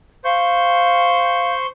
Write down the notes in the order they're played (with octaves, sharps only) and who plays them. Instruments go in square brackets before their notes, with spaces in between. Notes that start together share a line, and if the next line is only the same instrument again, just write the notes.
[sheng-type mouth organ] C5 C#6 G6 [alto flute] F5